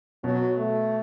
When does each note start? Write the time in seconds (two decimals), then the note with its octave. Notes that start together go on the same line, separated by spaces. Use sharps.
0.24 B2 F#3
0.58 A3